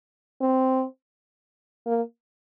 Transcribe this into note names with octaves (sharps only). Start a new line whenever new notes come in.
C4
A#3